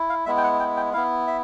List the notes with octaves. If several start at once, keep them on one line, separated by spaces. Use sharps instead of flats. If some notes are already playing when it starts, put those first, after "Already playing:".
Already playing: E4
F5
G#3 B3 E4 E5
G5
F#5
G5
G5
B3 E4 F5
E5